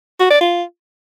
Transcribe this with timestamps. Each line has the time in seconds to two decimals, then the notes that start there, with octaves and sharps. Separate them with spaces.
0.19 F#4
0.30 D5
0.41 F4